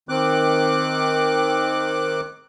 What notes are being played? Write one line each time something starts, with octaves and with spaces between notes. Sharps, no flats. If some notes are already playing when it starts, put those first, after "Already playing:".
D#3 C4 D6 F#6